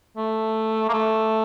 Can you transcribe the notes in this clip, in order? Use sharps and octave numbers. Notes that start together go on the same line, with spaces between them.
A3
A#3
A3